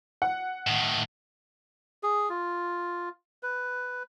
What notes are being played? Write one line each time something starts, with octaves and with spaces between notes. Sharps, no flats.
F#5
A2 D#3
G#4
F4
B4